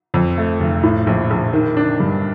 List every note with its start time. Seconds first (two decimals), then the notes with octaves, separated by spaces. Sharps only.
0.14 F2
0.38 A3
0.60 F1
0.83 A2
1.07 A#1
1.30 A#1
1.53 D#3
1.77 D4
2.00 G2